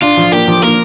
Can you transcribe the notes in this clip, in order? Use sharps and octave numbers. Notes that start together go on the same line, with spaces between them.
D4 F4
F3
A#3 G4
F3
A#3 A#4